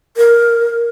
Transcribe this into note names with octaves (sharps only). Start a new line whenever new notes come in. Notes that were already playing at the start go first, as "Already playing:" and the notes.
A#4